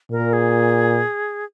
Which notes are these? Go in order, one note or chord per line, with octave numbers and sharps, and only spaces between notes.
A#2 A#4
G#4